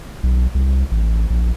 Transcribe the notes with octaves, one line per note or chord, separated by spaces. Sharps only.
B1
C2
A1
A#1